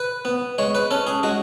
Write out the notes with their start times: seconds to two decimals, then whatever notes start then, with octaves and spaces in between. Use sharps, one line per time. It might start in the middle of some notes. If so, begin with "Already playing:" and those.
Already playing: B4
0.25 B3
0.58 G#3 C#5
0.75 B4
0.91 C#4 A4
1.07 G#4
1.23 G#3 F#4